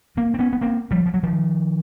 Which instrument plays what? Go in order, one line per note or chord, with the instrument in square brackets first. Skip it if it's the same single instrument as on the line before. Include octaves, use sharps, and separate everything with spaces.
[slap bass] A#3 C4
C4
B3 C#4
B3
A#3 C4
F3 G3
F3
F#3
D#3 F3